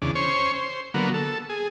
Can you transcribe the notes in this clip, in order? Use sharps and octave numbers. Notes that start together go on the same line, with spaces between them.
E2 C#3 D4
C#4 C5 C#5
C5
D3 F#3 A#3 B3
A4
G#4